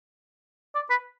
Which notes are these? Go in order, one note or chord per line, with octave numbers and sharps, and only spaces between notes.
D5
B4